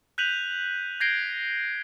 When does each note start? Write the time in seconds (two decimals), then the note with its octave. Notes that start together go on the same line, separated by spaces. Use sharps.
0.18 F#6 G6 B6 D#7 F7 F#7
1.00 G6 G#6 A#6 C7 D7 G7